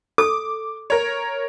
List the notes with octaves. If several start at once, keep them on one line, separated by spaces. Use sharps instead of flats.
A4 D6
A#4 C#5